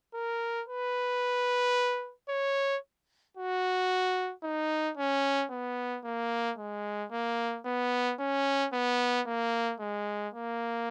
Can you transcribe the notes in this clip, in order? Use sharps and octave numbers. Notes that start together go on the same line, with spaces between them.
A#4
B4
C#5
F#4
D#4
C#4
B3
A#3
G#3
A#3
B3
C#4
B3
A#3
G#3
A#3